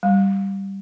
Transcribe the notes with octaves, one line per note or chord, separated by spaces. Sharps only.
G3